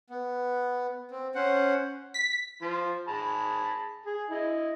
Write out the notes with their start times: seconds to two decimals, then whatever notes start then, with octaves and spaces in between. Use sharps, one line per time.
0.10 B3
1.11 C4
1.35 C#4 C5 F#5
2.14 B6
2.62 F3 C6
3.08 G#4 A5 B5
4.06 G#4
4.30 E4 D#5